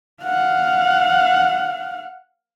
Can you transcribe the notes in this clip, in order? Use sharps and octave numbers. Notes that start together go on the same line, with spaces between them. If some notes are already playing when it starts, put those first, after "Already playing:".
F5 F#5